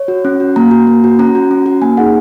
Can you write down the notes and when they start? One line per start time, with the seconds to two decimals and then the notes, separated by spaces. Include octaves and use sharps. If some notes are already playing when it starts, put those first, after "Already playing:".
Already playing: C#5
0.08 F#4
0.25 C#4
0.40 F#4
0.56 A#3 A#5
0.71 F#4
0.87 A#3
1.04 F#4
1.19 C#4 A#5
1.35 F#4
1.51 C#4
1.66 F#4
1.82 A#3 G#5
1.97 D#4 G#4 F#5